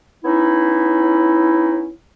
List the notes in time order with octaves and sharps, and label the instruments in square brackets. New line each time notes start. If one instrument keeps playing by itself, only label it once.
[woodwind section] B3 C#4 D#4 E4